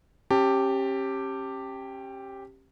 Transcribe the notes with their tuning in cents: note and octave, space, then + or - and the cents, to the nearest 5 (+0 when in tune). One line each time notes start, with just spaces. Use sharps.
C#4 -35 G4 +0 A5 +20